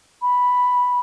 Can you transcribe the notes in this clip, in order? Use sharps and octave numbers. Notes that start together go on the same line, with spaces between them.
B5